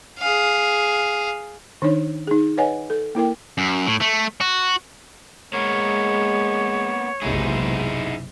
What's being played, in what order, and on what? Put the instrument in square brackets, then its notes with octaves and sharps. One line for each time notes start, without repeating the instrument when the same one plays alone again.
[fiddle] G#4 F5
[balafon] D#3 D4 D#4 C#5
D#4 G#4
B4 C#5 D#5 F#5 G#5
A4
A#3 E4 A#4 G5
[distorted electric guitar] F#2
A2
A3
F#4
[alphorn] G#3 [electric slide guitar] A#3 B3 A#4 [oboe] C#5
[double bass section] F#1 B1 C3 [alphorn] G#3 [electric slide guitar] D#4 E4 G#4